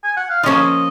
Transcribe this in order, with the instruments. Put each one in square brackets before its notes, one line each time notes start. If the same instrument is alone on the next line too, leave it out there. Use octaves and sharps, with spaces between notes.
[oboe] G#5
F#5
F5
[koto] F3 A#3 C#4 F4 [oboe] D#5